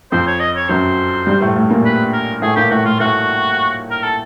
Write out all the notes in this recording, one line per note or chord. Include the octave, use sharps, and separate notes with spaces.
F2 F3 C5
C#5
D#5
C#5
F#2 F#3 C5
G2 G3
A2 A3
A2 A3
A#2 A#3
B4
A#4
A2 A3 G#4
A#2 A#3 G4
A2 A3 F#4
A2 A3 F4
A2 A3 F#4
A#4
A4